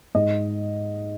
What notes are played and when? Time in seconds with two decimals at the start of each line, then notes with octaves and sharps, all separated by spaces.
0.15 G#2 D#5